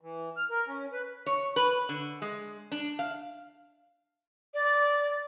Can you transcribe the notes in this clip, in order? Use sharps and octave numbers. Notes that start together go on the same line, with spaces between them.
E3
F6
A#4
C#4
B4
C#5
B4
D3
G#3
D4
F5
D5